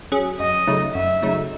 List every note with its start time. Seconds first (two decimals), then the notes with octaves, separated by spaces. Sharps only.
0.12 F#3 C#4 G#4
0.40 F#2 D#5
0.67 C#3 F#3 A3 D#4
0.94 F#2 E5
1.22 C#3 F#3 A3 D#4